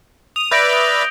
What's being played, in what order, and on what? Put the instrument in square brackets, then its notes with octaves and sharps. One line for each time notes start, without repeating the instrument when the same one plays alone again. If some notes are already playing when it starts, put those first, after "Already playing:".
[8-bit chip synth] D#6 [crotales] F7
[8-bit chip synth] B4 D5 E5 [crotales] G6 A#6 D7
[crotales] D#6 D7 G7